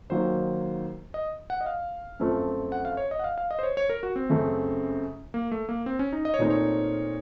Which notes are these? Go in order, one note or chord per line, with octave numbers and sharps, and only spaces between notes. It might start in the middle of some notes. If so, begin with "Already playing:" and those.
D#2 D#3 F#3 A#3 C5
D#5
F#5
D#5
F5
F#2 F3 A3 C4
F#5
F5
C#5
D#5
F#5
F5
F5
D#5
C5
C#5
C#5
A#4
F#4
C4
F#2 C#3 A3
A#3
A3
A#3
C4
C#4
D#4
D#5
C#5
A#2 A3 C4 D#4 A#4 C5
C#5